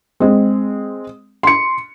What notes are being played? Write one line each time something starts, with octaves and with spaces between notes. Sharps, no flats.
G#3 C4
C6 C#7